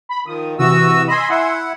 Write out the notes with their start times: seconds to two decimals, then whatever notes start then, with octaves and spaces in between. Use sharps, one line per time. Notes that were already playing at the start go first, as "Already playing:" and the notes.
0.09 B5
0.26 D#3 F3 D#6
0.59 C3 E3 F#4 D#6 E6
1.08 D#5 G#5 B5 C6 E6
1.30 E4 F#5